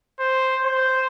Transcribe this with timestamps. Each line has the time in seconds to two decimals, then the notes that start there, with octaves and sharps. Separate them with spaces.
0.19 C5
0.65 C5